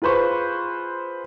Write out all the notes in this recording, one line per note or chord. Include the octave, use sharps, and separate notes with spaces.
F4 G#4 B4 C5 C#6